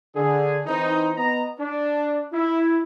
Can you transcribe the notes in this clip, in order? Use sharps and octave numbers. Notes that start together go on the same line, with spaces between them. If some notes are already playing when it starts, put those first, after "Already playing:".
D3 G#4
E3 C4 D#4
B3 D#5 A#5
D4
E4